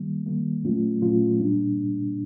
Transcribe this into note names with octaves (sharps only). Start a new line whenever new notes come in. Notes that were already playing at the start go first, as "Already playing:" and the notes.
Already playing: D#3 G3 A#3
D#3 G3 A#3
A#2 F#3 A3 C#4 F4
A#2 F#3 A3 C#4 F4
A#2 G3 A#3 D4